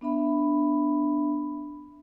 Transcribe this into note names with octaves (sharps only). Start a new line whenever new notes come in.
B3 D4 E5 B5